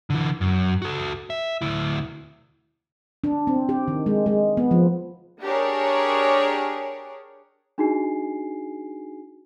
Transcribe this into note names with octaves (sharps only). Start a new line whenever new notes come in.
D3 E3
F#2
F#4 A4
E5
D2 E4
D4
C4
G4
D#3
G#3
G#3
B3
F3
D4 G4 G#4 A#4 C#5
D4 D#4 F#4 G#4 G#5 C7